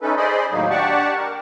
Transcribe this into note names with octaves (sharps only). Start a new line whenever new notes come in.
A3 C#4 D#4 A4 B4
G#4 C5 D5 D#5 B5 C6
D#2 A2 F#3 A#3 D#4
D4 G4 D5 F#5 A5 C#6
A#4